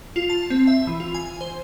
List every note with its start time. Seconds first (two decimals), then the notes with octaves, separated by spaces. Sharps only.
0.16 F4
0.30 A5
0.50 C4
0.67 E5
0.87 E3
1.00 F4
1.14 G#5
1.41 C5